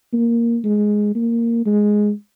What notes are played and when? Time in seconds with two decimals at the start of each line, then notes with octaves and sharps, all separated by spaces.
0.13 A#3
0.64 G#3
1.15 A#3
1.66 G#3